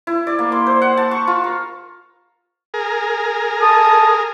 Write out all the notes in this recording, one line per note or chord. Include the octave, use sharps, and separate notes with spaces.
E4
D5
A#3
C6
C5
F#5
A5
C#6
F4
A#4
G#4 A#4
A4 A5 D#6